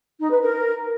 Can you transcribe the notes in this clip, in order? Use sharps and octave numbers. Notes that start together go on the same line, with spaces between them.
D#4
B4
A#4